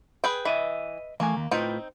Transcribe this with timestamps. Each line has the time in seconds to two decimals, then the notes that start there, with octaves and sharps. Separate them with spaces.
0.24 G#4 B4 G5
0.45 E3 B4 D#5 E5
1.20 E3 A3 A#3 G#5
1.37 D#2
1.51 A2 C4 D#4 F4 B4 G5